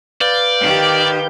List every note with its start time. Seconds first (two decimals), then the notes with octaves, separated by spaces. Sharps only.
0.21 B4 D5 F5 G6
0.61 D#3 G4